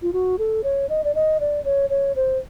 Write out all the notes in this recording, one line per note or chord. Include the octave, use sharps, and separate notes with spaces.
F4
F#4
A4
C#5
D#5
D5
D#5
D5
C#5
C#5
C5